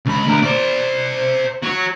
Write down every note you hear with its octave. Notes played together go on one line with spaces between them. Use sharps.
C#2 B5
D2 A#4
C5 D5
F#4 C#5